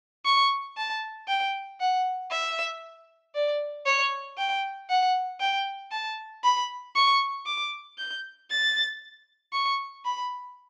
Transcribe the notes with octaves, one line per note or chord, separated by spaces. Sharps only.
C#6
A5
G5
F#5
E5
D5
C#5
G5
F#5
G5
A5
B5
C#6
D6
G6
A6
C#6
B5